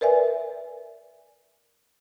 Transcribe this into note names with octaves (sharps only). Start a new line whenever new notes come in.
A#4 B4 D5 E5 G#5